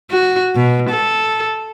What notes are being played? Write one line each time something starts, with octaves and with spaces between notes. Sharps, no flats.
F#4
B2
A4